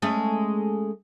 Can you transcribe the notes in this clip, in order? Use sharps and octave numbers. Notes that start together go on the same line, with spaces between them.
G#3 A3 C#4